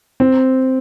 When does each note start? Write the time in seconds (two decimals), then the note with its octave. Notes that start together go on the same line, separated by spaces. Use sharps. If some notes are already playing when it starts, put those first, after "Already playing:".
0.20 C4